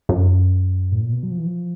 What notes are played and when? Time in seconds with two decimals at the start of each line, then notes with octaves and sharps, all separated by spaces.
0.09 F#2
0.92 A2
1.02 A#2
1.12 B2
1.23 F#3
1.31 F3
1.38 E3
1.46 F3